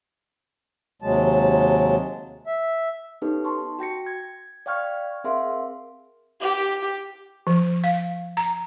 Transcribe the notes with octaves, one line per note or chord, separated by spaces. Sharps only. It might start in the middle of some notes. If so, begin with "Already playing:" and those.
D#2 C3 F#3 G#3 A5
E5
B3 C#4 D#4 G4 A4 B4
A5 C6 C#6
F#4 G5 A#6 C#7
G#6
D5 F5 G5 C#6 F6 G#6
C4 G#4 A#4 E5 F5 C6
G4
F3
F5
A#5